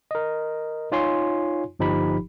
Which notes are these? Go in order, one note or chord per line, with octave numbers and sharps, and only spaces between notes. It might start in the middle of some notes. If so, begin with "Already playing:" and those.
A#4 D#5
D#4 F4 C#5 G#5 C6
G1 F3 D#4 G4 B5